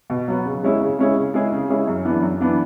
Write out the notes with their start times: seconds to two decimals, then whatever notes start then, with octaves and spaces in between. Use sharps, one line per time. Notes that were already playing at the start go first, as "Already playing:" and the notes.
0.10 B2
0.28 F#3 B3 F#4
0.46 C#3
0.63 G#3 C#4 E4 G#4
0.81 C#3
0.99 G#3 C#4 E4 G#4
1.16 C#3
1.34 G#3 C#4 E4 G#4
1.52 C#3
1.69 G#3 C#4 E4 G#4
1.88 F#2
2.05 E3 B3 D4
2.22 F#2
2.41 E3 B3 D4